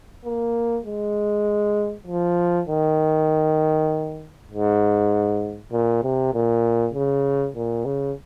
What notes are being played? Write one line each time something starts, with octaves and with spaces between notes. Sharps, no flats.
A#3
G#3
F3
D#3
G#2
A#2
C3
A#2
C#3
A#2
C#3